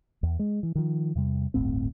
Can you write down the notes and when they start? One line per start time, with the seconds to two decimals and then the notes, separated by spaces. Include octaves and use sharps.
0.23 E2
0.39 G#3
0.63 E3
0.75 D#3 F3
1.15 E2 C3 G3
1.54 D1 G1 A2 C4